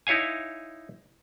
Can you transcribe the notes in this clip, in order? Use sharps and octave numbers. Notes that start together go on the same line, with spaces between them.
D#4 E4 C#5 F5 G#5